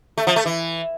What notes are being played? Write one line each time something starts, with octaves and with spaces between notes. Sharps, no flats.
A3
F3
A3
E3